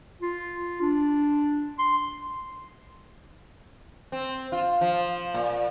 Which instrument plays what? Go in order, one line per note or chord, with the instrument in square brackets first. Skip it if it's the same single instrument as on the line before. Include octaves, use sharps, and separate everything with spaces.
[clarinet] F4
D4
C6
[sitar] C4
F4
F3
A#2